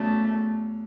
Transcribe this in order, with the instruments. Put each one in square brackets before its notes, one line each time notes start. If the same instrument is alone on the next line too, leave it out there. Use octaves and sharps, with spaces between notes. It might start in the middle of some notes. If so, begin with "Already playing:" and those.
Already playing: [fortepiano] E2 C#3 F#3 [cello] A3